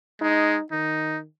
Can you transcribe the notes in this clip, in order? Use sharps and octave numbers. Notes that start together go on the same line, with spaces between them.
G#3 D#4
D#3 D#4